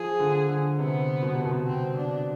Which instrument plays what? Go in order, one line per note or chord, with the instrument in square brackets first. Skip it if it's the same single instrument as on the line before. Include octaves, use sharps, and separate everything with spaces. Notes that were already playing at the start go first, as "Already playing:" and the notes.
Already playing: [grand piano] F3 [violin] G#4
[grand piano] D3
D3
[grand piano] C3 [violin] B3
[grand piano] B2
C3
B2
[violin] C4
D4